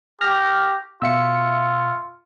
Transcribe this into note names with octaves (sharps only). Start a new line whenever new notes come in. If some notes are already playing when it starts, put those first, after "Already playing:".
G4 F6 A#6
B2 F4 E5 F5 E6 C#7